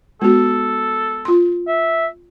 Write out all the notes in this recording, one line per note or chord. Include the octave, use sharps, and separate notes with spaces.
G#3 B3 F#4 A4
F4 C6
E5